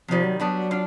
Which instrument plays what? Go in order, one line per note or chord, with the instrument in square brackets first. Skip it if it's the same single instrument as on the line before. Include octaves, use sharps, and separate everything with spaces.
[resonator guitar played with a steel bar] C3 D#3 G3 [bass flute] F3
[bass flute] F#3
[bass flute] F#3 [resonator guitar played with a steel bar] G3 B3 D4 F#4
[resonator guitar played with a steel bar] D4 F4